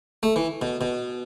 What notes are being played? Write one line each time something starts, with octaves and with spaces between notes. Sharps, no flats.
A3
E3
B2
B2